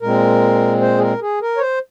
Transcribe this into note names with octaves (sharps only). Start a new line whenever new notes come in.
A#2 G#3 C4 A#4
C5
G#4
A#4
G#4
A#4
C#5
C5